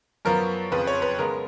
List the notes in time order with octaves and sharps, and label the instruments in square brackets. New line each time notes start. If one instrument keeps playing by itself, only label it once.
[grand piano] F#2 F3 B3 A#4
F2 C#3 F3 B4
C#5
B4
C#3 G#3 B3 A#4